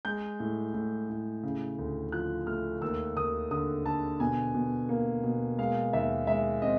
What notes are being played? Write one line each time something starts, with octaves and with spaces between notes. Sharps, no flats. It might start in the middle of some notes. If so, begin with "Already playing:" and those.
G#3 G6
A2
A2
A2
C#3
D2
F3 F#6
A3 F6
D#2 E6
D#2 D#6
D3 D#6
D3 A5
B2 G#5
B2
A#3
B2
G#3 F5
D#2 E5
G#3 E5
C4 D#5